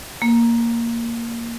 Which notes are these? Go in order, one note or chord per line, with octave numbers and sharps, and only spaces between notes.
A#3